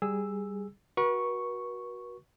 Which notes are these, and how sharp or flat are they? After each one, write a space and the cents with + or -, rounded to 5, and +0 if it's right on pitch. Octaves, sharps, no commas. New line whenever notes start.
G3 +0 G#4 -5 E6 +0
F#4 +0 B4 -45 C#6 +0